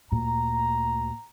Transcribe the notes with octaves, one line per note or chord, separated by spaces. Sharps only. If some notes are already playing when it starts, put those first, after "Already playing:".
D2 A#2 A#5